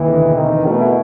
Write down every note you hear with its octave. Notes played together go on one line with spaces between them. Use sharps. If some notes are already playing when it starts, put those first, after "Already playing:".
Already playing: D#2 E3
D3
E1
D#3 C4
E3
B2 A3
E4